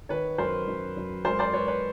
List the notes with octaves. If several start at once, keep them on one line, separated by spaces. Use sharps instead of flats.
D#3 B4 C#5
F#2 A#4 C5
F#2
F#2
G#3 A#4 C5
C5 D5
G#3 B4 C#5
B4 C#5